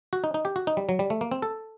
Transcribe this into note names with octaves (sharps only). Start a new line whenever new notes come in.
F#4
D#4
D#4
G4
F#4
D#4
G3
F#3
G3
A3
A#3
C4
A4